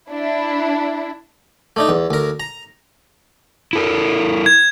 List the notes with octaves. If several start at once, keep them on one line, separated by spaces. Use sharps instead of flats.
D4 E4
A3 D4 D#4
E2
D2 A#4
A#5
E4 A4 A#4
G#6